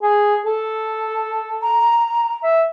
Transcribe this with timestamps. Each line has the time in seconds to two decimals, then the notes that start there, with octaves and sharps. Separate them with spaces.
0.03 G#4
0.46 A4
1.62 A#5
2.43 E5